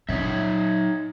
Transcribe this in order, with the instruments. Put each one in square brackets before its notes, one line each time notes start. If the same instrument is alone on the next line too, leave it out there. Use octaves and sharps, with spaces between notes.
[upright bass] A#2 F#3 [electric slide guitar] D#4 C#5 E5